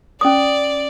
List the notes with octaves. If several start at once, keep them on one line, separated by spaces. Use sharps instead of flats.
C#4 D5 D#6